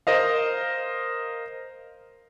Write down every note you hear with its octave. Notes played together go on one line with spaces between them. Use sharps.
A#4 C5 D#5 F5